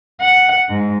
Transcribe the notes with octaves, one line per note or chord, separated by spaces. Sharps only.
F#5
G#2